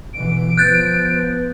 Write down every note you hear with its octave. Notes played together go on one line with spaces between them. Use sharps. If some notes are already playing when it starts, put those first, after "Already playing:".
B2 D3 E3 D7
F3 B3 F#6 G6 A6